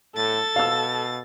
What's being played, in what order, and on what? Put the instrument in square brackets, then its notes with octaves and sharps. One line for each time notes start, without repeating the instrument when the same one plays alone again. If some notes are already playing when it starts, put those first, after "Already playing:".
[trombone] A2 [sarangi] A4 [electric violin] A6
[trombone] B2 [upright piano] F5 E6